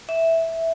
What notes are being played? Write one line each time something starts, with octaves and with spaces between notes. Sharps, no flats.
E5